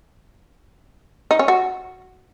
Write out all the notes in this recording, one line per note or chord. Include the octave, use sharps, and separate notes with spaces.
D#4
C#4
F#4